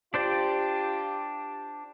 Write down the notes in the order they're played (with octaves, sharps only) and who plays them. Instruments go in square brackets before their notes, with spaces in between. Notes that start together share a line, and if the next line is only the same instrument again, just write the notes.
[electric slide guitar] D4 C5 D5 [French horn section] F4 G4